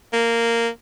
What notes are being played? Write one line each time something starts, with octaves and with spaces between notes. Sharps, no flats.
A#3